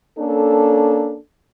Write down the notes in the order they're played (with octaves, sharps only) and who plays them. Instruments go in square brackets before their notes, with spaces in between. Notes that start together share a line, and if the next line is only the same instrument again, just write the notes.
[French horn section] A#3 C#4 D4 A4